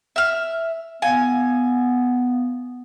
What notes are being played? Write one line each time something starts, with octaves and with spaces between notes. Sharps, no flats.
E5 F6
B3 F5 G#5